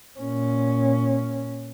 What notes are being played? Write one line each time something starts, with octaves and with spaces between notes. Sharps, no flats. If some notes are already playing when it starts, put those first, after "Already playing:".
A#2 C#4